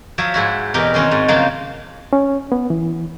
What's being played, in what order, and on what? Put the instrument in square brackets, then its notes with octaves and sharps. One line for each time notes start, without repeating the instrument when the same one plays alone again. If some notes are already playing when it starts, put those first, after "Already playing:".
[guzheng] F3 F#3 C#5 E5
G#2 E4 F#4
E2 B2 D#4 G4 A#4 G5
D#3 C4 C#4 F#4
G#2
C#3 F3 F#3 A#3 D#4 C5
[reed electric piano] C#4
B3
E3